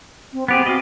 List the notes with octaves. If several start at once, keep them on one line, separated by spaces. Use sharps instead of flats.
C4
B3 C4 G4 G#4
F#4 D#5 F5